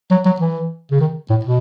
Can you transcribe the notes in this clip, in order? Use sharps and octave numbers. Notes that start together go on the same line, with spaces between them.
F#3
F#3
E3
C#3
D#3
A2
B2